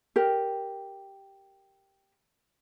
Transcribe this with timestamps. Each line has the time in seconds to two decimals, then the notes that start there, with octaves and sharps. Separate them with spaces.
0.16 G4 A#4